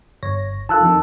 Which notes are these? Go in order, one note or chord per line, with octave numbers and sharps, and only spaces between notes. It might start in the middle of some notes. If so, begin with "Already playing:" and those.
G1 C#5 A#6
D#3 F4 A4 A5 E6 F#6
F2 D#3